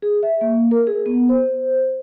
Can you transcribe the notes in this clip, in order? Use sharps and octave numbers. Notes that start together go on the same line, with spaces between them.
G#4
E5
A#3
A#4
G#4
B3
C5